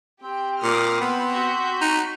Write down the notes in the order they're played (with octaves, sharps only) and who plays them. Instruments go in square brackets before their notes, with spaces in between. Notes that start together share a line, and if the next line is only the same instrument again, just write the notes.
[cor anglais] C4 [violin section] G4 G5
[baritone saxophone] A#2 [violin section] D6 D#6 F6
[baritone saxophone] B3 [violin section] B5
[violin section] F#4 G6 B6
[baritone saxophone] D#4